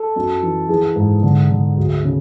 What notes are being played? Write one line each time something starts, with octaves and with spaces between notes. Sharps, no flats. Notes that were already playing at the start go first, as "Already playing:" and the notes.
Already playing: A4
F#2
E3
E3 G#4
G#2
D3
D3
D2
C#3